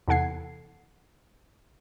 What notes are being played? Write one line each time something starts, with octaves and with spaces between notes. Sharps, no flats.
E2 C3 A4 F#5 G#6 C7